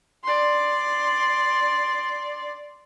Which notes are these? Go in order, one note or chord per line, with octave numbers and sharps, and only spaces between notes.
D5 C6